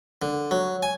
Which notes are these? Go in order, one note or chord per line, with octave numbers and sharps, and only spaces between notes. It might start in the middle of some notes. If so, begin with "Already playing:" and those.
D3
F#3
G#5